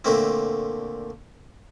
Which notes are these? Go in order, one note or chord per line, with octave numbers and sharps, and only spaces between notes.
A#2 D3 A3 C4 E4